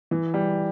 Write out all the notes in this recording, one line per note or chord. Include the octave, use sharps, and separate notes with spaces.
E3
G3